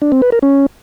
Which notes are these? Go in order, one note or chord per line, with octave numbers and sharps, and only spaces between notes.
D4
C4
B4
A#4
C#4